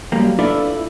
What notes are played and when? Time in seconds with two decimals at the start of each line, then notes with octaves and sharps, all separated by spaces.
0.12 F#2 G3 A#3
0.39 D4 E4 F4 A4 B4 D5